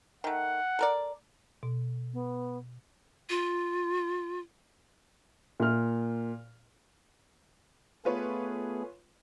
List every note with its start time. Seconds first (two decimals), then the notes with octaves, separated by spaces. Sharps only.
0.24 D#3 A3 F#5
0.79 A4 A#4 D5
1.63 B2
2.13 B3
3.30 F4
5.60 A#2 F6
8.05 A3 B3 F4 G#4 B4 C#5